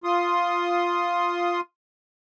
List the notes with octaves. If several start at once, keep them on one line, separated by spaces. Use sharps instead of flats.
F4 C6 D#6